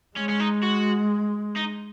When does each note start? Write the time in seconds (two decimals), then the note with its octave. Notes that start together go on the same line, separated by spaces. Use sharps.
0.17 G#3 C#4
0.29 C#4
0.40 D#4
0.63 F#4
1.56 D#4